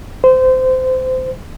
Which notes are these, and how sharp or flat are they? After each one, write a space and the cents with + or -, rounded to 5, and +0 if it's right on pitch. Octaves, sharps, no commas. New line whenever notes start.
C5 -25